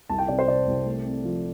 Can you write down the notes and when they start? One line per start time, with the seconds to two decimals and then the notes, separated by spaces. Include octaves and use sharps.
0.09 C2 A5
0.18 G5
0.28 C3 D5
0.39 C5
0.47 C3 D5
0.67 C2
0.85 A3
1.05 C4
1.24 F3